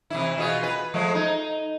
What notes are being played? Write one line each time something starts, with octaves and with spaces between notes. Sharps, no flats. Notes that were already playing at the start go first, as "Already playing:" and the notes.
C3 E3 E4
B2 F4 G#4
B4
F3 G#3 A3
D#4